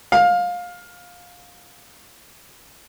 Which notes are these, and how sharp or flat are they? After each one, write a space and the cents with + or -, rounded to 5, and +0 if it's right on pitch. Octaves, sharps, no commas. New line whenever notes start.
F5 +20